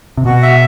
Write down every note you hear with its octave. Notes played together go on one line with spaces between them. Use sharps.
C3
B2 F#4
E5